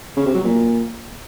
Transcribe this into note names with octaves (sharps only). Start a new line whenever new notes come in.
C#3
C3
F#3
A#2